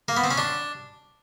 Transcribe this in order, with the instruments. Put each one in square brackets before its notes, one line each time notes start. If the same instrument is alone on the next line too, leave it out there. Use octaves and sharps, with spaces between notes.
[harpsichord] A#3
B3
C4
C#4
D4